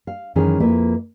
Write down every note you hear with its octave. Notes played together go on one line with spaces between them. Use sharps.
F5
F#2 D#3 E3 C#4 G#4
F2 A#3 E4 F4 B4